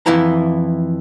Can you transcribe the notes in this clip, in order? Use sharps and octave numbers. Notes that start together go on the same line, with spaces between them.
F2 E3 E4 A#5